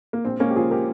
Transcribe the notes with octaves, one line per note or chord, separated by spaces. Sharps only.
A#3
A#1 C4
G#3 A#3 C#4
G4
F3 F4 G#4
G4 A#4